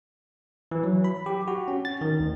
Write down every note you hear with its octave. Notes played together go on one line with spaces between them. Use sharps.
E3
F#3
B5
G4
F#4
C#4
A6
D#3
D2